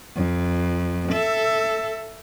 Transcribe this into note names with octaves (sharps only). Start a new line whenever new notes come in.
F2
A4 E5